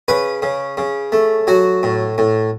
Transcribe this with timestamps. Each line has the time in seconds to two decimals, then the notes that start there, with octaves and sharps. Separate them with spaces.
0.08 C#3 B4
0.42 C#3
0.77 C#3
1.12 A3
1.47 F#3 F#4
1.83 A2
2.18 A2